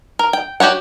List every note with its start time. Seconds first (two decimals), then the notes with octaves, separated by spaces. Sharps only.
0.19 A#4
0.33 G5
0.60 F#4 G4 C#5 F#5